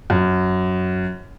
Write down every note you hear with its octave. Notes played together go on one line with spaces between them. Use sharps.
F#2